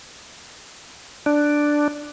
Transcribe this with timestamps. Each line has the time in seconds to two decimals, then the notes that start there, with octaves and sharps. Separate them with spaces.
1.26 D4